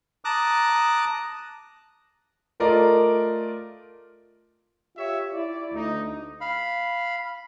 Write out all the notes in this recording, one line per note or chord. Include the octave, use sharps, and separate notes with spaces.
A5 A#5 D6 D#6 F#6
A3 F4 A#4 D5 D#5
F4 G4 C#5 E5
E4 D5
D2 D#4
F5 B5